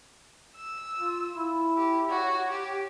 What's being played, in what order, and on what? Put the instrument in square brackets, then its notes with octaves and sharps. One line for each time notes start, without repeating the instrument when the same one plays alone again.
[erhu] E6
[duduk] F4
E4
[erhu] G4
[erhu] F#4 [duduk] C#5
[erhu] G4